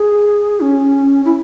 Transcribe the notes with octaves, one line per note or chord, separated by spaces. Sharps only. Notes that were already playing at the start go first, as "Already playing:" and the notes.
Already playing: G#4
C#4
E4